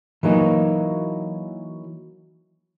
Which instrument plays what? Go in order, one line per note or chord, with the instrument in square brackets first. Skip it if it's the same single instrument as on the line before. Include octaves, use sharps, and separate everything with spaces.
[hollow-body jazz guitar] E3 F#3 A#3 D#4